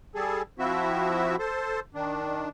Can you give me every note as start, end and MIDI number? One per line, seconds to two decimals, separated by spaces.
0.15 0.42 55
0.15 0.42 68
0.15 0.42 69
0.59 1.36 53
0.59 1.36 60
0.59 1.36 64
0.59 1.36 66
0.59 1.36 76
1.39 1.80 69
1.39 1.80 72
1.94 2.49 51
1.94 2.49 62